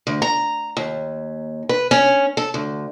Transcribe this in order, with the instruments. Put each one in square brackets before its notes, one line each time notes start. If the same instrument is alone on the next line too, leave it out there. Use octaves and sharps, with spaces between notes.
[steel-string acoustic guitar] D2
A#5
D#2
B4
C#4
A4
D2